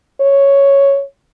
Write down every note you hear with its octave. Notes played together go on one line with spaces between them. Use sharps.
C#5